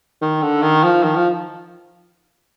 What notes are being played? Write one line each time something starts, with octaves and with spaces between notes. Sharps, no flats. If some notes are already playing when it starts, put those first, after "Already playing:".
D#3
D3
D#3
F3
D#3
F3